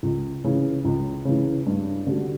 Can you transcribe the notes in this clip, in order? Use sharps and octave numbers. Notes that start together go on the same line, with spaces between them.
C#2
C#3 E3
C#2
C#3 E3
G2
D3 G3 D4 F#4